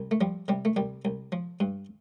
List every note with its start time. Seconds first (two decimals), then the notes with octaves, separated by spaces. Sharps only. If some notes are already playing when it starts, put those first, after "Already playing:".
Already playing: C2
0.11 A3
0.21 F3 G3
0.48 C3 G3
0.65 A3
0.76 C2 G3
1.05 C2
1.32 F3
1.60 G2